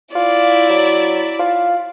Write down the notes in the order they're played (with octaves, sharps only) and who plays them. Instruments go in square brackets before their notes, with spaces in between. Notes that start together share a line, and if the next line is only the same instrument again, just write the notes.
[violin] E4 D5 [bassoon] F4
[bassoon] F#3
F4